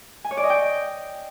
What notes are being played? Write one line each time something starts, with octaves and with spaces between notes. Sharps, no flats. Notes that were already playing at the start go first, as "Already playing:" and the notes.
G#5
C#5
D5
D#5
G5